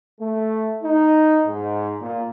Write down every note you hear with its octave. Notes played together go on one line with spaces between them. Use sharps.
A3
D#4
G#2
A#2